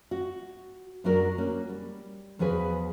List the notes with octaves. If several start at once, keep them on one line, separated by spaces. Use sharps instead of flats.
F#4
F#2 F#3 G#3 D4 F#4 A#4
A#3 C#4 F#4
G3
E2 F3 F#4 G#4 B4